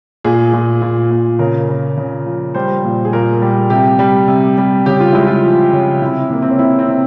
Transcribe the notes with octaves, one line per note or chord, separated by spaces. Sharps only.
A#2 G#4
A#2
A#2
A#2
C#3 A#4
C#3
C#3
F3
G3 C5
A#2
G#4
A#2 A#4
G3
C3 G4
G3
C3
G3
C#3 G4
F4
G#3 E4
F4
F3
C#3
C3 E4
C3 A#3
C4
C#4
C3 E4
C4
C3